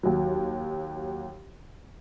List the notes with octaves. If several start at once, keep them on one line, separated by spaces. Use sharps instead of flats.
D#2 F#3